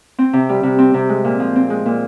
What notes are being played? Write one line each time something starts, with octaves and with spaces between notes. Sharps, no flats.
C4
C3
G3
C3
C4
C3
G#3
A#2
F3
C4
G#3
A#2